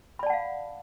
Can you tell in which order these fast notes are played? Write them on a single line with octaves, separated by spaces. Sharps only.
B5 D5 A5 F#5 F5